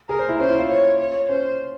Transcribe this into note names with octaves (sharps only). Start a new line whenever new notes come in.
G#4 A#4
C5
E4
C#4 C5
E4
F4
C#5
C#5
C#4 C5